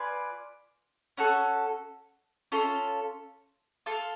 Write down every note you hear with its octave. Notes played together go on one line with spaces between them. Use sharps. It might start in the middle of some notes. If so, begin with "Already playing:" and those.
Already playing: F4 B4 D5 G#5
C#4 F#4 A4
C#4 F4 A4
F4 A4 F5